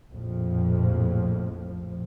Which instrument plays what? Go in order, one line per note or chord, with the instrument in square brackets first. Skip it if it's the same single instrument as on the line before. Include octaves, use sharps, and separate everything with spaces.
[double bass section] A#1 F2 A2 F3